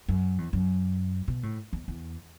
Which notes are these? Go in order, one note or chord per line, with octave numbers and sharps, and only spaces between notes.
F#2
E2
F#2
B2
A2
E2
E2